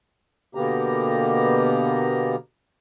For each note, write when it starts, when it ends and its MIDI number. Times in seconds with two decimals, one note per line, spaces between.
0.55 2.36 47
0.55 2.36 50
0.55 2.36 58
0.55 2.36 59
0.55 2.36 67
0.55 2.36 82